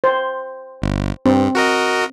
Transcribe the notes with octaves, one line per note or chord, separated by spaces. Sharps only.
C5
G1
G2 C4
F#4 A#4 D#5